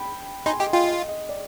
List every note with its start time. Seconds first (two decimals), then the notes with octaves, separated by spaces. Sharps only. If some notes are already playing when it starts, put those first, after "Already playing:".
Already playing: G5 B5
0.46 D#4 G#5 C6
0.59 G4 D#5 G5
0.73 F4 D#5 G5
0.88 D#5
1.08 D#5
1.29 D5